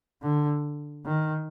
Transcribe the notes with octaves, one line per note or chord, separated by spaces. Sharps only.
D3
D#3